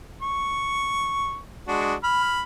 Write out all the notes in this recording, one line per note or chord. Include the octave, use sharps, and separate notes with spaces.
C#6
G#3 D4 F#4
B5 F6